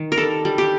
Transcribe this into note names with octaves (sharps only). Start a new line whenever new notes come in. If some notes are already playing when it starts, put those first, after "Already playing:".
Already playing: D#3
A#4
G3 A4
G3
G4